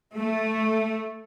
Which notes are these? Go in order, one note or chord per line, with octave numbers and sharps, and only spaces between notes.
A3